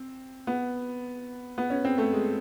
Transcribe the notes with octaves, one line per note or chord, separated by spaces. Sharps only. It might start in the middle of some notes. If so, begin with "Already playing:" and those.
Already playing: C4
B3
B3
C#4
C4
A3
G#3